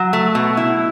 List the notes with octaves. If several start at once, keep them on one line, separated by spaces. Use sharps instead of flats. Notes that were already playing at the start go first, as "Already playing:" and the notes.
Already playing: F#3
A3
B2
E4